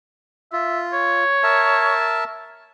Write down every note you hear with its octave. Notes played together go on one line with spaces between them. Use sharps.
F4 E5
C#5
A#4 E5 A5